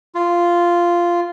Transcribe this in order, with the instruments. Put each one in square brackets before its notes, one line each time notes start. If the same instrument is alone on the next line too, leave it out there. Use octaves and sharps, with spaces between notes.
[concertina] F4